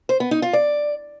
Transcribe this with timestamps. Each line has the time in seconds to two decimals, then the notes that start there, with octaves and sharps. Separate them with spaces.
0.09 C5
0.20 B3
0.31 D#4
0.42 F4
0.53 D5